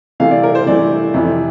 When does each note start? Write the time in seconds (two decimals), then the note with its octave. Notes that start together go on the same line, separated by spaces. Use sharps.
0.20 C3 E3 A3 F5
0.31 D5
0.43 A#4
0.55 C5
0.66 C3 E3 A3 D5
1.14 F2 C3 E3